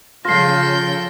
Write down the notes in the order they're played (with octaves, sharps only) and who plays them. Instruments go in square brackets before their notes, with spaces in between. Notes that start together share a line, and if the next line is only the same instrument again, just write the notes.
[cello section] C#3 F3 [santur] F4 [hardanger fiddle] A4 G5 [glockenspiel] A#6 C7